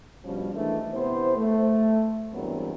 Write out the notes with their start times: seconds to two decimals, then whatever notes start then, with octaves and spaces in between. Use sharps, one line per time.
0.25 G2 B2 F3 G3 C#4 G4
0.54 D#3 E3 G#3 A3 D4
0.93 C3 B3 E4 C5
1.36 A3
2.33 E2 G2 F#3 B3 C4 A#4